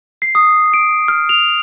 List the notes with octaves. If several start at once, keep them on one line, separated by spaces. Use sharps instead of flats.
C7
D#6
D7
F6
F7